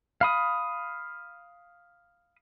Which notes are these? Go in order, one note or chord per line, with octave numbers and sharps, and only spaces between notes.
F5 B5 D#6